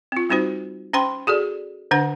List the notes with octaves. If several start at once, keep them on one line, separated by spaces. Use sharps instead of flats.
C4 F4
G3 C4 D#4 F#4 C5
C#4 C5 G5 B5 C6
F#4 G#4 A4 D5
D3 D4 C5 F#5